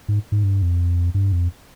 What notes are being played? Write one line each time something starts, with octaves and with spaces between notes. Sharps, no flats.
G#2
G#2
G2
F2
G2
F2